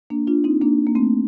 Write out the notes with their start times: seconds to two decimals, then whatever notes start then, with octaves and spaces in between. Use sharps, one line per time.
0.10 A#3 D4
0.27 D4 F4
0.44 C4 D#4
0.62 A#3 D4
0.87 A#3
0.95 A3 C4